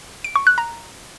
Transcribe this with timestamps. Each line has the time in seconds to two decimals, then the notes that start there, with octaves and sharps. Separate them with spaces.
0.24 D7
0.36 C#6
0.47 F#6
0.58 A#5